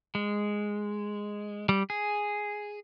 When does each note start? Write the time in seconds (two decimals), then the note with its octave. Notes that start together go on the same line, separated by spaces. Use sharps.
0.15 G#3
1.69 G3
1.90 G#4